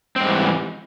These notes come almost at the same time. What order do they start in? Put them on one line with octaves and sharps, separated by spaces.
C4 G#2 G3 E3